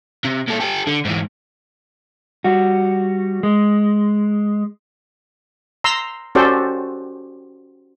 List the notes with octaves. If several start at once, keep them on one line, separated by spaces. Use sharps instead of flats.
C3
A#2 A4
G4 A4
D3
G#2 E3
G3 F#4
G#3
A#5 C6 E6
C#4 F#4 G4 A4 C5 D5